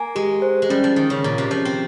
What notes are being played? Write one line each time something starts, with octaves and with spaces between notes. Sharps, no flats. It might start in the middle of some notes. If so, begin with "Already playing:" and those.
Already playing: A#3 G#5
G#3 G4
C5
G#3
G3 C#4
F3
D#3 G#4
C#3
A#2 C#4
C3
F3 C#5
C4